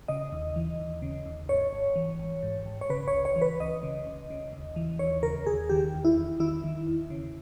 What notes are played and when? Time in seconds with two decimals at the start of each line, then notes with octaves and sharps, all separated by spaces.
0.08 C#3 D#5
0.32 D#2
0.56 E3
0.80 D#2
1.02 C#3
1.26 D#2
1.49 G#2 C#5
1.73 G#1
1.96 E3
2.19 G#1
2.43 G#2
2.66 G#1
2.81 C#5
2.90 C#3 B4
3.08 C#5
3.13 C#2
3.25 C#5
3.36 E3
3.42 B4
3.60 C#2 D#5
3.83 C#3
4.07 C#2
4.30 C#3
4.53 D#2
4.76 E3
4.99 D#2 C#5
5.23 C#3 A#4
5.46 D#2 G#4
5.69 D#3 G4
5.94 E2
6.05 E4
6.17 E2
6.40 D#3 E4
6.64 D#3
6.87 E2
7.10 C#3